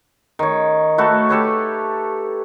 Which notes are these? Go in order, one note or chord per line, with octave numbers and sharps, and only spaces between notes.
D#3 C#5
A3 F#4 A4 B4
G4 A4 B4 C#5